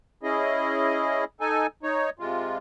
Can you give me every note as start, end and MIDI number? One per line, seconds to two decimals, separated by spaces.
0.23 1.25 61
0.23 1.25 64
0.23 1.25 68
0.23 1.25 75
1.41 1.67 63
1.41 1.67 69
1.41 1.67 80
1.83 2.10 63
1.83 2.10 73
2.19 2.58 48
2.19 2.58 56
2.19 2.58 65